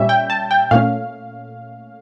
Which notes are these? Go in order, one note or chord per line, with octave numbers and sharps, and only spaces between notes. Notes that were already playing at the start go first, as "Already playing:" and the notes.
Already playing: A#2 G3 C#4 E5
G5
A5
G5
A#2 A3 C#4 F5